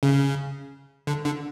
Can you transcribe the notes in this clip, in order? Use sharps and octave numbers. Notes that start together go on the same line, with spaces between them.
C#3
D3
D3